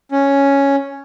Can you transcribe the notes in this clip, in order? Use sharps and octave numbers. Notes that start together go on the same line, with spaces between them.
C#4